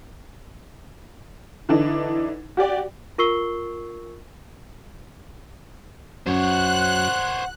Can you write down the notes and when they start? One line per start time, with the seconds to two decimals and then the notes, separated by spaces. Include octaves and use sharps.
1.69 D3 E3 D4 D#4
2.57 F#4 G4 D5 G5
3.18 F4 A#4 C#6 E6 C7 G7
6.26 F#2 C5 C#5 F#5 F#6